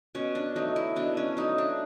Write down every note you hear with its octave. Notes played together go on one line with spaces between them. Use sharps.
B2 C#4
D4
F#3 A3 D#4
E4
B2 D4
C#4
F#3 A3 D#4
D4